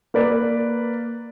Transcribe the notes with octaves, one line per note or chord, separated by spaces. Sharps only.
A#3 B4 D5